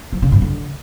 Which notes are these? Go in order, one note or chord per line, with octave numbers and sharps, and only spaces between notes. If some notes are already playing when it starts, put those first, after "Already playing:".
F3
C#3
G2
D3